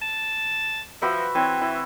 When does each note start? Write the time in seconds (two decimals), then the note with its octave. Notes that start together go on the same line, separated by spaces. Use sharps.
0.02 A5
1.02 F3 F#4 B4 E5
1.35 E3 C4 C#5
1.61 E3 E4